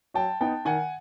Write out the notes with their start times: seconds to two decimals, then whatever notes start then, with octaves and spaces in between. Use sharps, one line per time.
0.14 F#3 G5 A5
0.41 B3 D#4 G5 A5
0.65 D#3 F#5 G#5